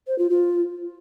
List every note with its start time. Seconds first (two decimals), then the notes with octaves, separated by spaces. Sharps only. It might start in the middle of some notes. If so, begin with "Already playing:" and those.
0.07 C5
0.18 F4
0.29 F4